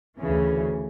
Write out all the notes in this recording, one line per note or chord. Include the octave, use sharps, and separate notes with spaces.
D2 C#3 E3